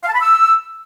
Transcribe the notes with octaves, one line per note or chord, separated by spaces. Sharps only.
F5
A5
B5
E6